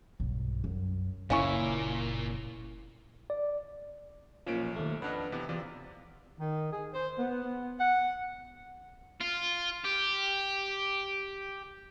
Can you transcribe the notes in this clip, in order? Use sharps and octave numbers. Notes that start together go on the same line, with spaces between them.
B1 G2
F#2
F#1 A#2 C#4 E4 F5 G#5 C#6
D5
B1 A#2 F3 C#4 D7
D#2 A3
F2 D4 B4 D#5 F#5 F6
C3 E3 B3
E2 C3 F4 D5
D#3
G#4
C5
B3
F#5
F4
G4